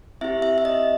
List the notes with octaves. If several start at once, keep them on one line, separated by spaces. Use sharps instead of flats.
C4 E4 G4 E5
E5
E5
D#5